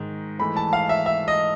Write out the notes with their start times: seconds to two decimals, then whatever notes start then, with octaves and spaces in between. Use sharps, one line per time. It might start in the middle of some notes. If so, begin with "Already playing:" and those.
Already playing: G#2 D#3
0.39 G#2 E3 A3 B5
0.57 A5
0.73 F5
0.89 E5
1.06 E5
1.28 D#5